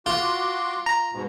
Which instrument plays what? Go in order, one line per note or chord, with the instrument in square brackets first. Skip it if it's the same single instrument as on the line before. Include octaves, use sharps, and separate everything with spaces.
[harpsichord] F4 [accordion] F#4 C6 D6
[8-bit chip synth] A#5
[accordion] G#2 B2